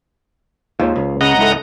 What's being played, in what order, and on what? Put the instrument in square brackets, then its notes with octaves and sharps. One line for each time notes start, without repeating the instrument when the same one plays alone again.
[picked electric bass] D#2 G#2 [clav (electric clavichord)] F4 C5 C#5
[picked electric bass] C#2
[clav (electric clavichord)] C#3 [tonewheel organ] D#5 F#5 A#5
[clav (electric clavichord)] G#2 E4 A4